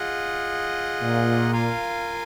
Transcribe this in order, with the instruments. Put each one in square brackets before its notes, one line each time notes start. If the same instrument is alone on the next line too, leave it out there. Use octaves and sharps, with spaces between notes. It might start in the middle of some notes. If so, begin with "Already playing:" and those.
Already playing: [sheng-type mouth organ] F4 G#4 D#5 F#5
[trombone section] A#2
[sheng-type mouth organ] F4 A#4 F5 G#5